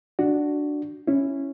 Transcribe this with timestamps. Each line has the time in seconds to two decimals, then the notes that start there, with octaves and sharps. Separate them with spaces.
0.19 D4 F#4
1.07 C#4 E4